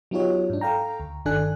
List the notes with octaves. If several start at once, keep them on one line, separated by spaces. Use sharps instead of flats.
F#3 B3 D#4 F4 G4 C#5
G#2 D4
A4 F5 G5 A#5
D2
G1 D#3 D4 A4 G#5 F#6